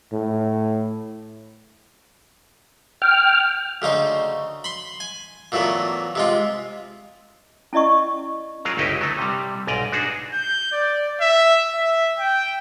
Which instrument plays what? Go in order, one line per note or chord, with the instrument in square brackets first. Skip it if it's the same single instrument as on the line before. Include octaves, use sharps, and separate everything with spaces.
[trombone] A2
[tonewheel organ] G5 F6
[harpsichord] D2 C#3 D#4 C5
B5 C6
G#5
A#2 E3 F#3 A3 B3
C3 G#3 F4
[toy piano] C#4 E4 D5 D#5 C#6
[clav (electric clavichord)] F#3 F4 G#4 A#4
G1 C#2 D#4 E4 G4 D#5
F#3 A3 D#4
C3 G3
B1 G#2 D5 D#5 A#5
D4 D#4 F#4 G#4
[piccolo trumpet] G6
D5
E5
E5
G5